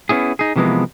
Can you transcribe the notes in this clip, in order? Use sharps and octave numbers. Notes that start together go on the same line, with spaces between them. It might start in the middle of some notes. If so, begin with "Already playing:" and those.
B3 C#4 E4 G#4
D#4 G#4
C3 E3 F3 G#3 A#3 B3